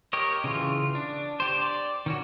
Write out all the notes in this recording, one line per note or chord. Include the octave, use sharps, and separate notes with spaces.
G4 A#4 C#5 D#5
C#3 E3 F4
D4
G4 C5
D5
D#3 C#4 F#4